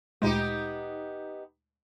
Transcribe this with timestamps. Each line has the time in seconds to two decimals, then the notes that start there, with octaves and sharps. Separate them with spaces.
0.22 D2 A#2 G#3 B3 D#4 G4